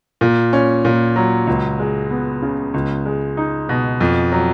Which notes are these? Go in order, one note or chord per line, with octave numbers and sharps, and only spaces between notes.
A#2
C#4
A#2
F#3
C#2
G#3
B3
C#3
C#2
G#3
D#4
B2
F2
F#3